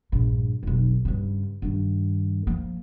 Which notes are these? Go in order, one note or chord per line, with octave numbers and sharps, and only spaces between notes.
A#1 G2
F1 B1
G2 C#3
G2 D#3
F3 A#3